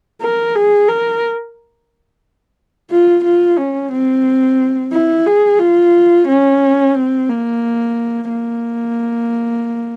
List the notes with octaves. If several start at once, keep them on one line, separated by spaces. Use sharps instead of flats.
A#4
G#4
A#4
F4
F4
C#4
C4
E4
G#4
F4
C#4
C4
A#3
A#3